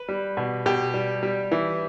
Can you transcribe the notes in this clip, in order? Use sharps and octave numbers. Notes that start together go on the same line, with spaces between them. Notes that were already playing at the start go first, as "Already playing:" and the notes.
Already playing: B4
G3
B2
B2 G4
G3
G3
E3